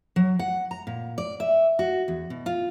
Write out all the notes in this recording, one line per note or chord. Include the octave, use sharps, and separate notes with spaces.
F#3
F#5
A#5
A#2
D5
E5
F#4
E2
B2
F4